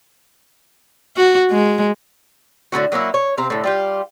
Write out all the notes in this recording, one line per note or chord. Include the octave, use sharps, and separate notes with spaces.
F#4
G#3
A2 D3 E3 F#4
F#3 A#3 C#4 E4
C#5
C3 C4 F5 A#5
A2 D3
G3 F4 G4